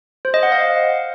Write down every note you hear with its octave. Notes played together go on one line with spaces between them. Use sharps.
C5
D#5
F#5
F5